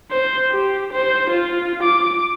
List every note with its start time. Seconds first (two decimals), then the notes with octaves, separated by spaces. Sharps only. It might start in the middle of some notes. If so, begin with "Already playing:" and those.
0.11 C5
0.51 G4
0.93 C5
1.30 F4
1.83 D6